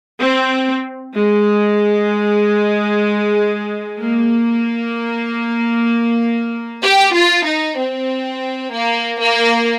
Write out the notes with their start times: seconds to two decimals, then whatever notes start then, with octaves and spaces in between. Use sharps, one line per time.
0.21 C4
1.15 G#3
3.99 A#3
6.83 G4
7.14 F4
7.46 D#4
7.78 C4
8.72 A#3
9.20 A#3